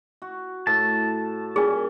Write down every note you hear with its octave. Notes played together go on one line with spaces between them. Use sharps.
F#4
A2 A5
A#2 G3 C#4 G#4